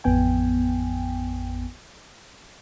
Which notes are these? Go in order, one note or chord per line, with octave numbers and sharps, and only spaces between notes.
A1 F2 B3 G5 G#5